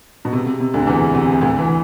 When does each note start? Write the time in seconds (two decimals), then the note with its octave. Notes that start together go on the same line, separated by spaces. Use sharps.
0.25 B2
0.33 C3
0.46 C3
0.60 C3
0.74 D2 D3
0.87 E2 E3
1.14 C3
1.41 D2 D3
1.59 E3